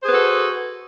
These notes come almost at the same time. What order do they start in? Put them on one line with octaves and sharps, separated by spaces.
C5 G#4 B4 F#4 A4